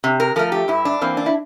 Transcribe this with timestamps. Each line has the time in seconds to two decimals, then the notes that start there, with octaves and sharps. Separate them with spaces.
0.04 C3
0.20 A#4
0.36 F3 A3 A#4
0.52 G4
0.68 G2 E4
0.85 D4
1.01 E3 A#3 C4
1.17 D4
1.26 E4